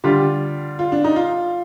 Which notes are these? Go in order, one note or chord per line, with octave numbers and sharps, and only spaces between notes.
D3 G3 D4 F4 G4
F4
D4
D#4
F4